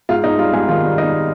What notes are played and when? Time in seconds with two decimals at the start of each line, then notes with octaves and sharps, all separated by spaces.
0.09 G#2 F4
0.24 G#2 D#4
0.38 G3 F4
0.53 G#2 G#4
0.69 D#3 F4
0.83 G3
0.98 G3 D#4